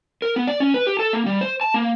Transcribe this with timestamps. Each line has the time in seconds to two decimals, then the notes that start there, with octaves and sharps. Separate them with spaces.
0.22 A#4
0.36 B3
0.47 D5
0.60 C#4
0.74 B4
0.87 G4
1.00 A4
1.13 A#3
1.26 G3
1.41 C5
1.61 A5
1.74 A#3